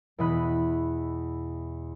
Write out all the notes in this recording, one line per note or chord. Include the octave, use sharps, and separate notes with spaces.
E2 B2 E3 D#5 B5 F#6